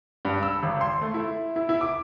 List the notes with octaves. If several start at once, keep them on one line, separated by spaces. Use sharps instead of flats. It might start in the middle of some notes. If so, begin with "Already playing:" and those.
G2
E6
G#1
C6
A3
E4
E4
E4
D6